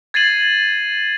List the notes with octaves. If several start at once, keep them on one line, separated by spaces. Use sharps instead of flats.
G#6 A6 C7 D#7 F#7